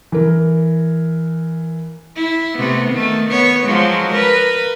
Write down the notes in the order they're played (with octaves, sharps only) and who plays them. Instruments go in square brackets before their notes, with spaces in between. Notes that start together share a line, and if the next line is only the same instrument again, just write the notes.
[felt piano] E3 A#4
[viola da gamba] E4
C3 A3 B3
D#3 A3
B3 C#5
F3 F#3 G#3
A#4 B4